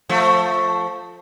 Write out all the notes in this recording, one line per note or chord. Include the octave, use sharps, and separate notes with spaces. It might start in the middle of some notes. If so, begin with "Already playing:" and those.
F3 A3